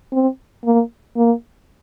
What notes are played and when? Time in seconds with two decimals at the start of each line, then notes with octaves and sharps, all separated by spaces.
0.12 C4
0.65 A#3
1.16 A#3